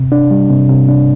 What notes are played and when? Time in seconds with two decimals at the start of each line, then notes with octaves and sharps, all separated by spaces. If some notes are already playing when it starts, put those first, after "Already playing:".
Already playing: C3
0.12 D4
0.31 G3
0.50 C3
0.69 C3
0.88 D4